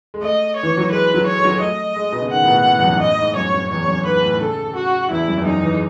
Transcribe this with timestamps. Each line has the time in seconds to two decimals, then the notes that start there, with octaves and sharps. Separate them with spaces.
0.14 G#3
0.22 A3 D#5
0.56 C#5
0.63 E3
0.77 F#3
0.92 G#3 B4
1.14 F#3
1.27 C#5
1.38 G#3
1.45 F#3
1.53 G#3
1.61 A3 D#5
1.96 G#3
2.12 B2
2.22 C#3
2.31 D#3 F#5
2.43 A2
2.48 B2
2.66 A2
2.79 E2
2.84 F#2
2.93 G#2
3.00 A2 D#5
3.19 G#2
3.36 F#2 C#5
3.54 F#2
3.70 E2 C#5
3.88 F#2
4.05 G#2 B4
4.23 A2
4.41 C#3 A4
4.64 C#3
4.76 F#4
5.10 E2 E4
5.28 F#2
5.37 E2
5.45 F#2 D#4
5.63 E3
5.73 G#3